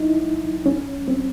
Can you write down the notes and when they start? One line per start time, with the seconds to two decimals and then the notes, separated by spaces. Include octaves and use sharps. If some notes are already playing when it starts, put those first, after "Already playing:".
Already playing: D#4 E4
0.66 C#4
1.08 C4